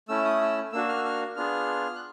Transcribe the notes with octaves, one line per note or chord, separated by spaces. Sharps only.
A3 C#4 E4 E6
D#6
E6
A#3 D4 F#4 E6
F6
E6
F6
B3 D4 F4 G#4 F6
F#6